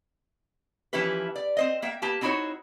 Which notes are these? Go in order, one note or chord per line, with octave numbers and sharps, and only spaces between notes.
E3 F3 C#4 E4 G4 B4
D5
C4 C5 D#5
A#3 E5 G5
A#3 G4 B4 A5
C4 D#4 E4 F#4 C5 C#5